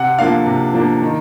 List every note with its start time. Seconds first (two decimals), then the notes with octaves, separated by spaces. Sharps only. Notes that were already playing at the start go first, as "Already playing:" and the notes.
Already playing: C3 F#5
0.18 F3 A#3 D4 F5
0.46 C3
0.74 F3 A#3 D4
1.01 D#3